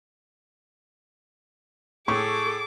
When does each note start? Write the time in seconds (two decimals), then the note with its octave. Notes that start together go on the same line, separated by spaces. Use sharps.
2.08 A2 G#4 A4 C#6 D6